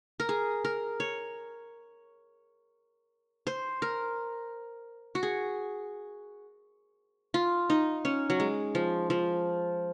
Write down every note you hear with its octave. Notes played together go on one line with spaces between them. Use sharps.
A#4
G#4
A#4
C#5
C5
A#4
F#4
G#4
F4
D#4
C#4
F#3
G#3
F3
F3